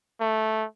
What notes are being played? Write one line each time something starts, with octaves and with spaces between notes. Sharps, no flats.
A3